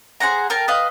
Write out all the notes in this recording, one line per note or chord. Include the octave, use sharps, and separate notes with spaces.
G#4 C5 F#5 A#5
A#4 G5 A5
B4 D#5 F5